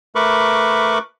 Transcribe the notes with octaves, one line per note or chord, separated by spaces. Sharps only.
A3 A#4 B4 B5 C#6 D6